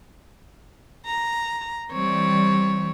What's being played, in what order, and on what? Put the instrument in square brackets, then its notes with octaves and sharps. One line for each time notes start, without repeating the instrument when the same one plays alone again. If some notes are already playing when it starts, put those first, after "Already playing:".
[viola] A#5
[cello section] E3 G3 [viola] C4 C#5